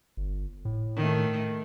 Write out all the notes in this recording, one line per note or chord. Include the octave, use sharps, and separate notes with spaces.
G1
A2
D#3 A3